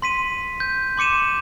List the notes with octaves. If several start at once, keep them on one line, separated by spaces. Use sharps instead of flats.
C6 B6 D#7
G6
C6 D6 C#7 D#7 E7